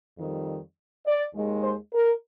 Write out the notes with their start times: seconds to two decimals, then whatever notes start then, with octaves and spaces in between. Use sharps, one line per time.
0.19 F2 D#3 G3
1.06 D5
1.35 D#2 D#3 G#3
1.64 C5
1.94 A#4